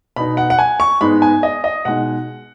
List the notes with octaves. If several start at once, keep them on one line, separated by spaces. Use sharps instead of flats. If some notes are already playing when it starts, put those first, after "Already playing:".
B2 B3 D#4 B5
F#5
F#5
G#5
C#6
G#2 G#3 B3 D#4 B5
G#5
D#5
D#5
B2 G#3 D#4 F#5